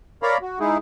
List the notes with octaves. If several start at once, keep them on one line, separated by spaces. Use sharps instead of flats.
A#4 C#5 D5 F5 A#5 B5
F#4
G#3 D#4 E4 G#4